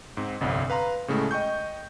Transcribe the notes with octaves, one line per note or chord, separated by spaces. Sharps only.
G#2 C4
G1 C2 F2
B4 F5 A#5 C6
A2 C#3 G#3 A3
D#5 G5 C#6 G6